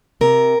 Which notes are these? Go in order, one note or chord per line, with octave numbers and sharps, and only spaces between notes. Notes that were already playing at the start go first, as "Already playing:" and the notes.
C3 A#4